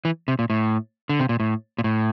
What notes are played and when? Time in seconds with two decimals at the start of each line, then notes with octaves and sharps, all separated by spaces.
0.05 E3
0.28 C3
0.39 A#2
0.50 A2
1.09 D3
1.20 C3
1.29 A#2
1.40 A2
1.78 A#2
1.84 A2